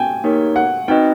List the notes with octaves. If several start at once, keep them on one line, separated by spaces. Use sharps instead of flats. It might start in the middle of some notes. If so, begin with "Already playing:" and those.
Already playing: G5 G#5
A#3 D#4 G4 A#4 C#5
F#5
C4 D#4 F#4 B4 D#5 G5